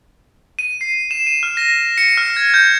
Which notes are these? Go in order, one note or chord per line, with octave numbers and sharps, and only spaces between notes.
D#7
C7
E7
D#7
F6
A#6
C#7
F6
G#6
G6